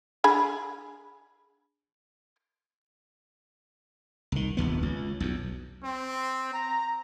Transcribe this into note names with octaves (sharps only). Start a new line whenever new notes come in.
D4 G#4 B5
C2 D#3
F1 A#1 D#2 B3
C#2
B1 E2
C4
A#5